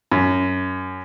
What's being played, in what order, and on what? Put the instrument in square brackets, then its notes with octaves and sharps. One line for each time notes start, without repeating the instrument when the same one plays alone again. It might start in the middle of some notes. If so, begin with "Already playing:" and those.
[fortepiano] F#2